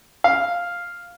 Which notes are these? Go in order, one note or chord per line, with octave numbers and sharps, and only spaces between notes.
F5